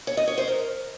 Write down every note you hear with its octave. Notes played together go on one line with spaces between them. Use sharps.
C#5
D#5
C#5
C5
A#4